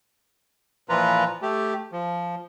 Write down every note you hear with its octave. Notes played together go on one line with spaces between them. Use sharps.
A#2 E3 F3 F4 B4 A#5
A3 G4
F3